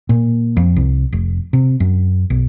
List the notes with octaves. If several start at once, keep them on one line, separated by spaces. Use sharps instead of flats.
A#2
F2
C2
F1
C3
F#2
B1